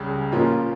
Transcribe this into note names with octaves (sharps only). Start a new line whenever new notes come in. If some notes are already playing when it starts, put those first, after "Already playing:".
Already playing: C#2 C#3 G3
A#2 F3 A#3 C#4 F4